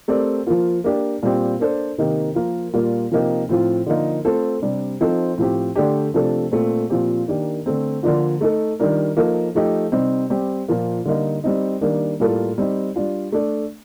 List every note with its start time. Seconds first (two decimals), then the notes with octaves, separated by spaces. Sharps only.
0.08 A3 C4 G4 A#4 D5
0.47 F3 A#3 F4
0.84 A#3 D4 G4
1.22 A#2 G3 C4 G4
1.59 A#3 D4 A4 C5
1.98 C3 D#3 A#3 D#4 G4
2.35 F3 A#3 F4 A#4
2.74 A#2 G3 A#3 F4
3.12 C3 F3 A#3 D#4 G4
3.49 A2 F3 C4 F4
3.86 D3 F3 A#3 D#4 A#4
4.25 A3 C4 F4 A4 C5
4.62 C3 G3 D4
5.01 F3 C4 D#4 A4 C5
5.38 A2 F3 C4 G4
5.76 D3 A3 D4 G4
6.14 C3 F3 A3 D4 A4
6.52 A#2 A3 C4
6.90 A#2 F3 C4 G4
7.28 D#3 A#3 D4 G4
7.66 D3 A3 C4
8.03 D3 F3 A#3 D4 F4
8.41 A3 D#4 A4
8.80 D#3 G3 D4 F4 A#4
9.17 F3 A#3 D#4 A4
9.55 F3 A3 D#4 G4
9.92 C3 G3 C4 D#4
10.30 G3 C4 G4
10.68 A#2 F3 A#3
11.05 D3 G3 A#3 D#4
11.44 G3 C4 D#4
11.81 D#3 G3 A#3 D4
12.20 A2 G3 A#3 F4 A4
12.58 G3 C4 D#4
12.96 G3 D4 F4
13.32 A3 D4 A4 D5